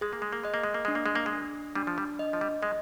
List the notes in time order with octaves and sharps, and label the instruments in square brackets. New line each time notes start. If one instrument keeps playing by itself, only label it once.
[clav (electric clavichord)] G#3 [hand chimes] G#4
[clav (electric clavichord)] A#3
G#3
A#3
[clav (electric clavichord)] G#3 [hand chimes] D#5
[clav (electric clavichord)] A#3
G#3
A#3
[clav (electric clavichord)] G#3 [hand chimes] D4
[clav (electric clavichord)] A#3
G#3
A#3
G#3
[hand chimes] D4
[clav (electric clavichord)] G3 [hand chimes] D4
[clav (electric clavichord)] F3
G3
[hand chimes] D#5
[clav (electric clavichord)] F3
G3
[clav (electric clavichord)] G#3 [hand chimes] D#5